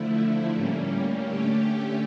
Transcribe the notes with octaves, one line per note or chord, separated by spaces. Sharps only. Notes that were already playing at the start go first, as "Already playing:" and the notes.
Already playing: D3 F3 A3 E4
A2 G3 A#3 C#4
D3 A3 C#4 G4